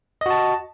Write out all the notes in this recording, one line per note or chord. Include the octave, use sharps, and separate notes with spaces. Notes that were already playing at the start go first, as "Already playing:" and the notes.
F#4 D#5 A5